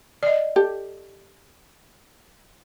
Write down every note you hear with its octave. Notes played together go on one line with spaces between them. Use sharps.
D5 D#5
G4 A4